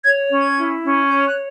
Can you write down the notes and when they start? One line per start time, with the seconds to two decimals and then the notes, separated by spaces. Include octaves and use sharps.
0.05 C#5 G#6
0.31 C#4
0.39 G#6
0.57 E4
0.84 C#4
1.09 C#5 G6
1.27 F#6